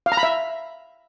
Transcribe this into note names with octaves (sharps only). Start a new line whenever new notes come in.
F5
A#5
B5
E5